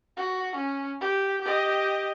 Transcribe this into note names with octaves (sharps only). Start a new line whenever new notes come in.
F#4
C#4
G4
G4 D#5